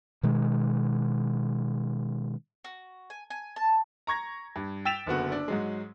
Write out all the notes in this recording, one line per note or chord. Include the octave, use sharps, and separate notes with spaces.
B2 D#3 G#3
F#4
G#5
G#5
A5
A#5 C#6 G#6 A#6
G2
G5 E6 A6 B6 E7 F7
F#1 D3 B3 F#4
D4
G#2 F#3 G#3